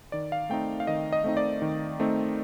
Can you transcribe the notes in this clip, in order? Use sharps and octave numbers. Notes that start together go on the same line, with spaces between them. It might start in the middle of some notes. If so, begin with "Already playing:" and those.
D#3 D5
F5
A3 C4 D#4 G5
F5
D#3 D#5
D#5
A3 C4 D#4
D5
D#3
A3 C4 D#4